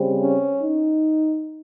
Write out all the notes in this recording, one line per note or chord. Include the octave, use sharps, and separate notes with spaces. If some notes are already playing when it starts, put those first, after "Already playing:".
Already playing: C#3 G3 C4
C#4
D#4